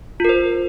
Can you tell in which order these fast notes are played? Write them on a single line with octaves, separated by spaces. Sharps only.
F4 A#4 C5